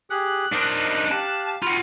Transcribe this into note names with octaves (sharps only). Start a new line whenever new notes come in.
G4 G#4 F#6
D4 D#4 A#4 C5 C6
G4 F5 A5
F4 F#4 B5